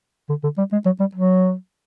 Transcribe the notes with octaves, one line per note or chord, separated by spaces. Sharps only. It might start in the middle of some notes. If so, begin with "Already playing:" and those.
D3
D3
G3
G#3
F#3
G3
F#3